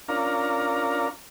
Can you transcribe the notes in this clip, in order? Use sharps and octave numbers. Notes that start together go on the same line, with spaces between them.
C#4 D4 F4 A#4 F5 A#5